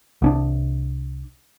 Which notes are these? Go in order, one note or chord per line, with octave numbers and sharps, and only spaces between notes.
C2 C#4 D4